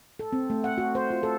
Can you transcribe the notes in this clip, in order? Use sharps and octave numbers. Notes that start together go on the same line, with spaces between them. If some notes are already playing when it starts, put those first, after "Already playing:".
A4
C4
A3
F#5
F#4
C5
F4
A4